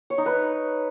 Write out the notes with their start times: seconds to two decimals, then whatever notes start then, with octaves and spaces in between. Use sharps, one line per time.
0.10 C#5
0.18 D#4
0.26 B4